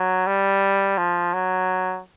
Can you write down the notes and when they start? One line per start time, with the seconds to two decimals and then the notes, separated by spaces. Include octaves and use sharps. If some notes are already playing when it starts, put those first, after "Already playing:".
Already playing: F#3
0.27 G3
0.98 F3
1.33 F#3